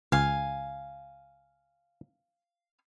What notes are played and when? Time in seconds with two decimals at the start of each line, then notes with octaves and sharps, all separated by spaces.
0.12 C#2 F5 G#5